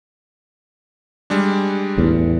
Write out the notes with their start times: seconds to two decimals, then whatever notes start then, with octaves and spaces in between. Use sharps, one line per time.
1.30 G3 G#3 D4
1.98 E2 A2